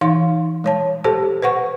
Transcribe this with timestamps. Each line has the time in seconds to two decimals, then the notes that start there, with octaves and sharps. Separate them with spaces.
0.01 E3 D#4 F5 C6
0.64 G#3 C#5 A5
1.04 G4 A4 C5 A5
1.42 B4 C5 F#5 C#6